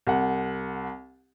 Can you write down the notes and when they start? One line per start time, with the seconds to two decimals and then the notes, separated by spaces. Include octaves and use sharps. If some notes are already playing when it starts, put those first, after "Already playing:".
0.07 C2 F#5